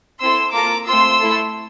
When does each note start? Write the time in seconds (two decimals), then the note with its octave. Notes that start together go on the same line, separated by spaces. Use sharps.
0.20 C4 E4 A4 C6 E6
0.53 A#3 F4 A4 A#5 D6
0.87 A3 C4 F4 C6 E6
1.20 A3 E4 A4